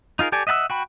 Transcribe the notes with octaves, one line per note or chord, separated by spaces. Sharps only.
D#4 F4 G#4 A#4
G4 A4 D5 G#5
D#5 E5 F#5 A5 E6
F#4 G5 B5